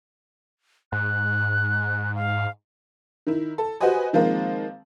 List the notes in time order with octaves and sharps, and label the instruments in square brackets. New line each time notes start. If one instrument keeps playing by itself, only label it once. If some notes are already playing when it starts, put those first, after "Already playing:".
[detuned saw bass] G#2 [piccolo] F#6
[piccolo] F5
[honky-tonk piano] D#3 E4
A4
F#4 G4 B4 C5 D#5 G#5
D#3 F3 G#3 A#3 C4